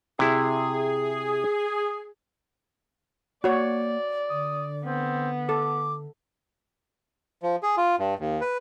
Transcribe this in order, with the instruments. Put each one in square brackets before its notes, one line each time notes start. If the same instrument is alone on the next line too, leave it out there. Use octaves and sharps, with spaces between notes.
[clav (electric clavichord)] C3 E4 [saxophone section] G#4
[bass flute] A#3 [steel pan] F#4 C#5 [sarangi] D5
[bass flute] D3 [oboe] D#6
[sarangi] B3 [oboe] C4
[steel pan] A4 [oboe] D6
[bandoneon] F3
G#4
F4
G2
D#2
B4